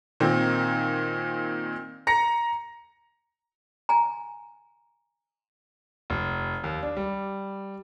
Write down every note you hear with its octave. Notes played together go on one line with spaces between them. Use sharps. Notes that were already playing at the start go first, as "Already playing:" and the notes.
A#2 D#3 C4
A#5 A#6 C#7
G#5 A#5
F1
D#2
D4
G3